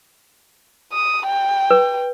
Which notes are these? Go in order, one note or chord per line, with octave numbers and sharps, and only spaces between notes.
D#6
G5
B4